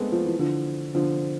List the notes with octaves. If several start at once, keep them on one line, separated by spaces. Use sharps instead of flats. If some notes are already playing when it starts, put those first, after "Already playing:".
Already playing: G#3 A3 B3 C4 D4
F3
E3
D3 F3
D3 F3